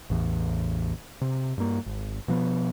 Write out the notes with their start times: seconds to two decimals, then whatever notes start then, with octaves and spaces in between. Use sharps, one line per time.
0.10 A1 E2
1.21 C3
1.58 G2 A#3
1.86 G#1
2.28 B2 F3 B3